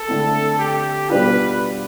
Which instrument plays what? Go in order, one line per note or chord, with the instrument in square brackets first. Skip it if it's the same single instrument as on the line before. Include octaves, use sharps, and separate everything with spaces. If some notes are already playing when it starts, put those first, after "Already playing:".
Already playing: [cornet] A4
[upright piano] D3 A3 C4 E4
[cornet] G4
[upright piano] B2 G3 D4 F4 [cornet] B4